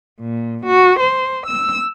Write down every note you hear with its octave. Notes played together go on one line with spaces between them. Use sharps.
A#2
F#4
C5
E6